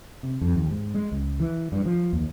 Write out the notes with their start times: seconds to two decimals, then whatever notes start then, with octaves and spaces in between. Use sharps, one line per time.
0.23 C3
0.41 F2
0.55 D#2
0.71 G#2
0.94 G#3
1.11 C#2
1.40 E3
1.72 G2
1.85 F3
2.13 D#2